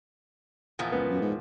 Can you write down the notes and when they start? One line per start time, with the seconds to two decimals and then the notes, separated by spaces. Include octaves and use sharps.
0.79 E2 A#2 F3
0.92 C#2 B3
1.10 F#2
1.21 G#2